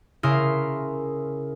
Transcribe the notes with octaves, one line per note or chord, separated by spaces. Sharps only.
C#3 E4 A#4 C6 D#6